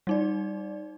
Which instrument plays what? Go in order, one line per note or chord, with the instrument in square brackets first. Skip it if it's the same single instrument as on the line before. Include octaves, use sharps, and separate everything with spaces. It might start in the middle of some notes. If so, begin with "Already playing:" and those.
[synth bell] G3 D#4 D5